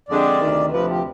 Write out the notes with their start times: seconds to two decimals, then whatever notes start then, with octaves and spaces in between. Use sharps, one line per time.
0.08 F2 D3 G#3 D4 G4 D5
0.41 D2 C3 D#3
0.72 D2 C3 F3 B4
0.88 G4